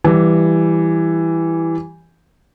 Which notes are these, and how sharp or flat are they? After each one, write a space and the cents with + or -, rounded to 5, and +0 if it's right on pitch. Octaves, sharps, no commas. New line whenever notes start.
E3 +0 G3 +0 G4 +0